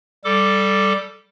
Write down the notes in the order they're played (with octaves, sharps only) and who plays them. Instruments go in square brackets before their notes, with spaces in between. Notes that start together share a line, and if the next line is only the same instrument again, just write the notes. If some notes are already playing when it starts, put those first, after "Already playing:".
[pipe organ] G3 A4 D6